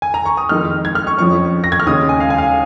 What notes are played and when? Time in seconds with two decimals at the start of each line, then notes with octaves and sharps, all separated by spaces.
0.02 G#5
0.14 A#5
0.26 C#6
0.37 D#6
0.49 F2 D#3 G#3 D#4 F6
0.85 G#6
0.95 F6
1.07 C#6
1.18 F2 F3 C#4 C#6
1.64 A#6
1.72 G#6
1.80 F6
1.87 D#2 C#3 G#3 D#6
2.09 G#5
2.20 F5
2.30 G#5
2.38 F5